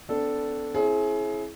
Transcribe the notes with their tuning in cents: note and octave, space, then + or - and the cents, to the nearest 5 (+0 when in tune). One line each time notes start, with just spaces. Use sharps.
B3 +40 D4 -10 A4 +0
C4 +45 E4 +0 G#4 +30